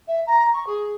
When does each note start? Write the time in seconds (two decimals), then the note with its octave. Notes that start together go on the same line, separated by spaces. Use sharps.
0.07 E5
0.27 A#5
0.53 C#6
0.66 G#4